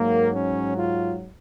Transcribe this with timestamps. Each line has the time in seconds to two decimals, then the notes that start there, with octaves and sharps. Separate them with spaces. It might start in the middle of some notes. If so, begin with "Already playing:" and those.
Already playing: G#2 F#3 A#3
0.35 C#4
0.77 F4